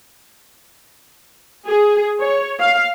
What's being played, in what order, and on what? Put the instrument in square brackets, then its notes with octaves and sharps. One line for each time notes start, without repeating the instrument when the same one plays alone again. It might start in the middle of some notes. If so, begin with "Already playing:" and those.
[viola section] G#4
C#5
F5